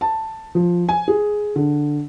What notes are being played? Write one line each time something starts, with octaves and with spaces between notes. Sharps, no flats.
A5
F3
G#5
G#4
D3